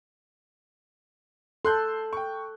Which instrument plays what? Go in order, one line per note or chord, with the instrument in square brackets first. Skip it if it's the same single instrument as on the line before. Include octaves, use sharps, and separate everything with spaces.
[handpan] A4 [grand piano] C6 F#6 G6
[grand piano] G5 C#6